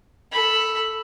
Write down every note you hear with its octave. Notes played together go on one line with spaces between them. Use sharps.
A4 B5